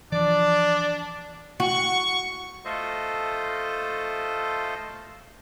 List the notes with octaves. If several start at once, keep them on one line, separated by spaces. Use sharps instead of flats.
E3 F3 D4 D5
F#4 C#6
A3 F4 A4 C5 D#5